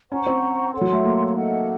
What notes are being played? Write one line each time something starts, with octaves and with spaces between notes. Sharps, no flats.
C#4 C5 F#5 A#5 C#6
C4
A4 C#5 F#5 C6
F#3
A3
A#3
D#4 A4 D#5 F#5